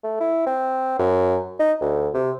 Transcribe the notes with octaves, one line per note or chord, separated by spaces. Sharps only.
A3
E4
C4
F#2
D#4
D2
C3